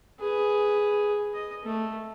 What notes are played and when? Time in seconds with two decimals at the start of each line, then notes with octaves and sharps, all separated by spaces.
0.20 G#4 B4
1.34 D#5
1.63 A3